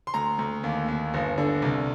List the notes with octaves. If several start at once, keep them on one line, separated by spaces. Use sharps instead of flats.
C6
D2 A#5
D2
D#2
D#2
G1
D3
C2